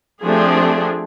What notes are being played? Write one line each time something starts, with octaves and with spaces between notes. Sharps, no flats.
F3 A3 C4 D4 G4 G#4